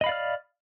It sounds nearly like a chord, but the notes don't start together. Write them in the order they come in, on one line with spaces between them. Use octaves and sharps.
D#5 B5 F5 D5 F6